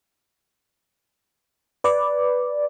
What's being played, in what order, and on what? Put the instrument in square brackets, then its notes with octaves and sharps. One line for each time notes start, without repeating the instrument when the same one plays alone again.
[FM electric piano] B4 D5